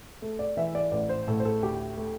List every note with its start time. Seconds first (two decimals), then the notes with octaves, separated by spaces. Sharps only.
0.22 A3
0.39 D5
0.57 E3 E5
0.75 D5
0.92 A1 D5
1.09 C5
1.28 A2 A4
1.40 C5
1.45 A4
1.62 D2 G4
1.97 A3